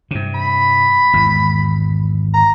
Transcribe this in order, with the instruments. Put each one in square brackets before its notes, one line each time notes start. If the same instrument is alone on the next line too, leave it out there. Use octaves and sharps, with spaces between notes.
[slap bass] G2 C3
[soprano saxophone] B5
[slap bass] G#1 E2
[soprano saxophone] A#5